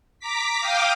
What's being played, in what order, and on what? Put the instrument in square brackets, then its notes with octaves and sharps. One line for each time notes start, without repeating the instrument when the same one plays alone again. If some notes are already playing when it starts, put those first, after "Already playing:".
[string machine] A#5 D6 B6
F5 G5 D6 D#6 F6 G6